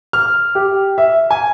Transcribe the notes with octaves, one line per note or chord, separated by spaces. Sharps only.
F6
G4
E5
G#5